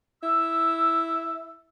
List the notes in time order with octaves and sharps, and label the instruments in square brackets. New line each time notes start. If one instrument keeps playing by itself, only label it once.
[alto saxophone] E4 [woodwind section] E6